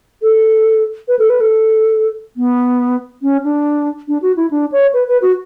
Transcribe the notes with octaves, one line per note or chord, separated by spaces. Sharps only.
A4
B4
A4
B4
A4
B3
C#4
D4
D4
F#4
E4
D4
C#5
B4
B4
F#4